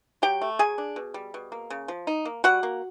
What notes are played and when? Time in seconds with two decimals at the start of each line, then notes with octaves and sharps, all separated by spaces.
0.22 F#3 G4 G5
0.41 A3
0.59 F#3 G#4 G#5
0.78 D4
0.96 B2
1.14 G3
1.34 B2
1.52 A#3
1.70 C#3
1.88 F3
2.07 D#4
2.25 A#3
2.44 G3 F#4 F#5
2.63 A#3